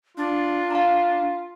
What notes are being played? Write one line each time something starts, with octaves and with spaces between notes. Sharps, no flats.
D4 F4
F5 A5 A#5